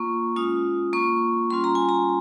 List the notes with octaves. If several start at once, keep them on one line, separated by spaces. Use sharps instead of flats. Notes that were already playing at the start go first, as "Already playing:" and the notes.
Already playing: A#3 F4 C#6
G#3 C#4 F4 D#6
A#3 F4 C#6
G3 C#4 F4 C6
A#5
G#5
A#5